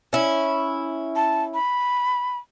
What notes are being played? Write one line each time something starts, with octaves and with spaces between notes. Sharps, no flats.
C#4 E4
A5
B5